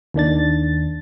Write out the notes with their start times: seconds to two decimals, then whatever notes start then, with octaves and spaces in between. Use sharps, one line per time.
0.14 D#2 D#3 D4 A6